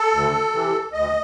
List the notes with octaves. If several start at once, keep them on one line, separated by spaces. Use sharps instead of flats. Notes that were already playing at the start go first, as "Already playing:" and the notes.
Already playing: A4
D2
C3 E3
D2 D#5